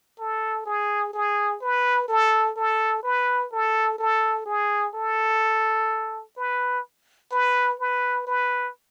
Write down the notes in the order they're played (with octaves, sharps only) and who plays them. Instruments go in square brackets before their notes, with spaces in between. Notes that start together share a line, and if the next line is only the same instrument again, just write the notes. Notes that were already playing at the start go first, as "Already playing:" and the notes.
[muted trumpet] A4
G#4
G#4
B4
A4
A4
B4
A4
A4
G#4
A4
B4
B4
B4
B4